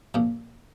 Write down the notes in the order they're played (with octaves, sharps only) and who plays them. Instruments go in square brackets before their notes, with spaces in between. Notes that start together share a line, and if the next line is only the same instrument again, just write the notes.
[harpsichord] A#1 A#2 F3